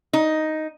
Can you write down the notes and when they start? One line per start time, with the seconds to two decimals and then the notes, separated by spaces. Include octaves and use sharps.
0.13 D#4